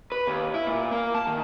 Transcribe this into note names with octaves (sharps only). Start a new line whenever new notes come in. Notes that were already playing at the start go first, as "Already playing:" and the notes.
B4
D#2
E4
A#2
A#3
A5
D#3